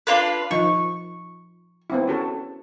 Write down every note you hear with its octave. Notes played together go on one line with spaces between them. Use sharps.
D4 F4 B4
F3 D#4 C#6
B3 C4 E4
C#4 F#4 A4